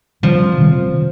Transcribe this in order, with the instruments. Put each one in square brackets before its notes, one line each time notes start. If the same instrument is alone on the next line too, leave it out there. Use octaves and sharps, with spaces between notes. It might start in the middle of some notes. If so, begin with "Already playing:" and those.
[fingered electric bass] C3 D#3 G3 C4 [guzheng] F3
[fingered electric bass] C3 D#3 G3 C4